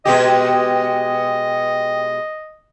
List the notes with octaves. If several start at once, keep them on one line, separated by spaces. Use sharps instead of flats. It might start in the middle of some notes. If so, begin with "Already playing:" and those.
B2 G#3 G4 D#5 G5 D#6